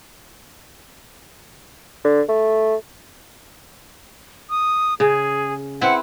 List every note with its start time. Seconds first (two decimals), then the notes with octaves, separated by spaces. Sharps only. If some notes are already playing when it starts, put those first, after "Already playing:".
2.04 D3
2.28 A3
4.50 D#6
5.00 C#3 G#4
5.81 C4 E4 B4 F#5